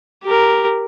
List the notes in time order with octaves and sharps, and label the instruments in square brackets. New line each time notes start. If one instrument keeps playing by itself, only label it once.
[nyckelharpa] G4 A#4